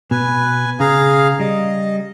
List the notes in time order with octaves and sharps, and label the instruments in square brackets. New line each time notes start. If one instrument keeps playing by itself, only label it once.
[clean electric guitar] B2 [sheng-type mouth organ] B4 G#5
[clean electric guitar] C#3 [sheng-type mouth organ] G#4 F5 A#5
[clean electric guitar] G3 [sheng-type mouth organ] D#5